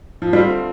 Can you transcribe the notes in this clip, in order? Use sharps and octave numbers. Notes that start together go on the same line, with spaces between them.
F3
D3 G3 A3 C4 F4